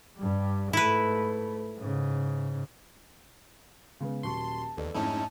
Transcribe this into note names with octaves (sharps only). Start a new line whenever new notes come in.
G2 G3
G#2 A3 E4 B4
G#2 C#3
C#3 G#3 B3
D#1 F#3 A5 C6 C#6
D#2 A4 B4 D5
F2 G#2 A3 C#4 D#4 E4 A5